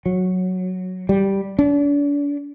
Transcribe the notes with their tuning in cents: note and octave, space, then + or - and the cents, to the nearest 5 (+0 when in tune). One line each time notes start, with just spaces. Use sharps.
F#3 -5
G3 -5
D4 -40